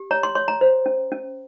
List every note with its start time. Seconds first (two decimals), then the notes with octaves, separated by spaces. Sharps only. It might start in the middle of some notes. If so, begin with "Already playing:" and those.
Already playing: G4
0.11 C#5 A#5
0.23 C6
0.35 C#5 C6
0.48 A#5
0.61 C5
0.86 C#4
1.12 C#4